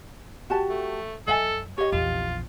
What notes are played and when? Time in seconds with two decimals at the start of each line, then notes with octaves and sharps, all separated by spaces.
0.50 F#4 G4 A5
0.69 A3
1.28 F#2 A4 D#5 E5 G#5
1.78 G4 C#5 D#5
1.92 A#1 E2 F4